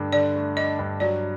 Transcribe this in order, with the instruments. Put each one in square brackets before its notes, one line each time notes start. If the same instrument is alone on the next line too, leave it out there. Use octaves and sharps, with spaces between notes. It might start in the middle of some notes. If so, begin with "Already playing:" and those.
Already playing: [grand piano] G2 D3 A3 D4
[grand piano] D3 [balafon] D5
[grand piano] A3
[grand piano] D4 [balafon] D#5
[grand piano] G2
[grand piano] F#3 [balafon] D5